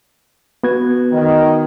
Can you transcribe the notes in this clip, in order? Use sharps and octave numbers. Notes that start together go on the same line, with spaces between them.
B3 F#4 G#6
D#3